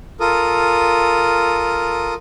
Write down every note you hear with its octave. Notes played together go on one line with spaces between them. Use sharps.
F4 A4 A#4 D#6